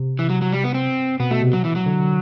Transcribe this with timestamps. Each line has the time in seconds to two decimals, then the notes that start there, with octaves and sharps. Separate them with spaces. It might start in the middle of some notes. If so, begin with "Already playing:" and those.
Already playing: C3
0.19 E3
0.30 F#3
0.42 F#3
0.52 G3
0.64 B3
0.74 C4
1.20 B2 B3
1.31 B2 A3
1.42 C3
1.53 F#3
1.65 E3
1.76 F#3
1.86 D3